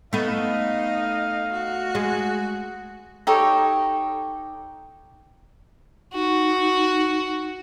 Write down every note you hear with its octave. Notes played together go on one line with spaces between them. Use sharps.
A3 B3 D#4 F5
F#4
G#3
D#4 G4 A4 C#5
D#4 F#4